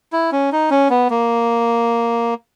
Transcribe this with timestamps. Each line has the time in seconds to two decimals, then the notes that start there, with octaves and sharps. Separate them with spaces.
0.13 E4
0.32 C#4
0.52 D#4
0.71 C#4
0.90 B3
1.10 A#3